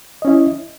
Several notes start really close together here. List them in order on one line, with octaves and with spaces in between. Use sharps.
D#5 C#4 E4